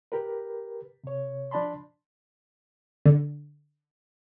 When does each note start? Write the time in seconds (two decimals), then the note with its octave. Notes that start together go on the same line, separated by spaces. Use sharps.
0.12 G4 A#4 B4
1.04 C3 C#5
1.51 F3 D4 D5 A5 B5 C6
3.06 D3